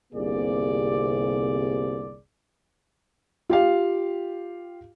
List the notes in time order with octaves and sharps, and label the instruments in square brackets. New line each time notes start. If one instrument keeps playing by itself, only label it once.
[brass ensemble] G1 C2 C3 A#3 G#4 D5
[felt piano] F4 G4 F5